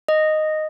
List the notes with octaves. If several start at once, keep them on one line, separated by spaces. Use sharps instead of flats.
D#5